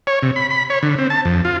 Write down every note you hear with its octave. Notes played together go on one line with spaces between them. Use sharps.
C#5
C3
B5
B5
C#5
D3
C4
A5
F2
F4